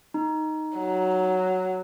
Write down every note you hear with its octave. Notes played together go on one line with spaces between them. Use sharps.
D#4
F#3